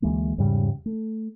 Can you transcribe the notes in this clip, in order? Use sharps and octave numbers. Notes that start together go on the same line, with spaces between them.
D2 E3 G#3 A#3
E2 G#2 C#3 G3
A3